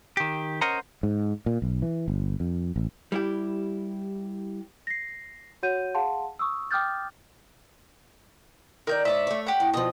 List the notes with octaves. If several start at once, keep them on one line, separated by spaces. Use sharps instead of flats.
D#3 G4
C#4 A#4 C5 D#5 F#5 A#5
G#2
A#2
B1
E3
G1
F2
A1
G3 E4 G4
A#6 C7
F#4 C#5 F#5 G6 D#7
G#4 F5 F#5 A5 C6
C#6 D#6 E6
G5 D6 D#6 F6 G6 A6
D#3 A#4 D5 G6
G#2 C#5 D5 E5
A3 C#5
G4 F#5
A2
B2 F3 D#5